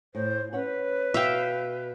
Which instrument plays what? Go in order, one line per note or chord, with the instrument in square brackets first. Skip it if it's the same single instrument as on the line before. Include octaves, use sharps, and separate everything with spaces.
[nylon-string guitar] A2 [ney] C5
[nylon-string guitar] C#4 C#5 F#5 [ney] B4
[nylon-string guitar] B2 F#4 [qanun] E5 F5 G5